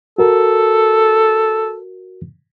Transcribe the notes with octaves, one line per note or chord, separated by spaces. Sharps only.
F#4 A4 A#4